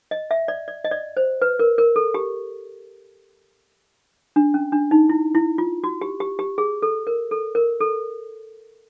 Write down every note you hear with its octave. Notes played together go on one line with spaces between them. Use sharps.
D#5
E5
D5
D5
D#5
D5
C5
B4
A#4
A#4
A4
G4
D4
C#4
D4
D#4
E4
E4
F4
F#4
G4
G4
G4
G#4
A4
A#4
A4
A#4
A4